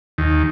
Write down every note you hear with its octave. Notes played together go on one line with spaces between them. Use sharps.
D#2